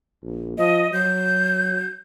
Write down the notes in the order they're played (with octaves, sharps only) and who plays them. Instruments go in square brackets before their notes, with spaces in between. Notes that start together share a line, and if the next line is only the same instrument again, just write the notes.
[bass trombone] A#1
[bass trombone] F3 [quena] D#5
[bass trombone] F#3 [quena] G6